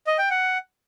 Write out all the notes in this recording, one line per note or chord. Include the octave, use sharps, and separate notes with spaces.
D#5
G5
F#5